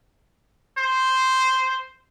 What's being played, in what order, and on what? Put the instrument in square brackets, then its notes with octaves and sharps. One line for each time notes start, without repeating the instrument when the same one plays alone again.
[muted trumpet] C5